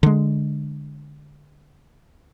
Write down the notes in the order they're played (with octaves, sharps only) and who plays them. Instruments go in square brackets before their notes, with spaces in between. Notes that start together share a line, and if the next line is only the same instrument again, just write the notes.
[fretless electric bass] D3 G#3